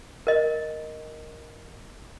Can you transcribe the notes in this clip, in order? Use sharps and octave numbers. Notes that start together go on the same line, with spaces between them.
A#4 D#5